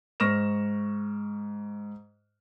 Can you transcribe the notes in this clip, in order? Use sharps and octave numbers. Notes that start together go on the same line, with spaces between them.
G#2 C#6 F6 A#6 E7